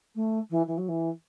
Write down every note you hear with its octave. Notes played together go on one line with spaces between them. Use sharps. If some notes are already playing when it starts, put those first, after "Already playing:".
A3
E3
E3
F#3
E3